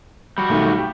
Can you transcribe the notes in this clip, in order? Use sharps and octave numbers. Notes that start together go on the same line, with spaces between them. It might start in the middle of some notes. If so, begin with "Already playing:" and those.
G3 F#4
B1 D#3 A3
G4